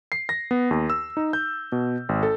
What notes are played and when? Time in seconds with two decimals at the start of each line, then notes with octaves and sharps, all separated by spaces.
0.12 C7
0.29 A#6
0.51 B3
0.71 D#2
0.90 E6
1.17 D#4
1.33 G6
1.72 B2
2.09 G#1
2.23 A4